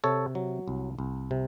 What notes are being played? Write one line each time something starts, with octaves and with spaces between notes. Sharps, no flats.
C3 A4 C#5
F#3
C2
C2
C3